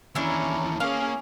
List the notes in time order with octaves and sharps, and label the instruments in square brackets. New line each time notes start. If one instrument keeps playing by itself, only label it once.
[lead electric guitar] D#2 E3 [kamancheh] C#4 A#5 [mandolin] D4 E4
[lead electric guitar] A#3 [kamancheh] C#4 G#4 [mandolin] F5